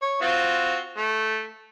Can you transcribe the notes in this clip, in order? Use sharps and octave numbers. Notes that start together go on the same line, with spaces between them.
C#5
C4 F4 F#4
A3